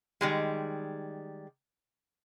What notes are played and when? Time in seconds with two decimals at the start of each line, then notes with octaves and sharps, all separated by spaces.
0.21 D#3 G3 G#3